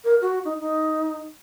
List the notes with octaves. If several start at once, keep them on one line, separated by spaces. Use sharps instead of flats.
A#4
F#4
D#4
D#4